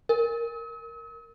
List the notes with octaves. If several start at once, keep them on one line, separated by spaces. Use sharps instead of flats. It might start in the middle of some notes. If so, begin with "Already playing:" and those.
A#4